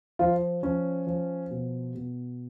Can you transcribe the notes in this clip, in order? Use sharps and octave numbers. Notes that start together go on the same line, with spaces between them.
F3 F4
F3 C#4
F3
B2
B2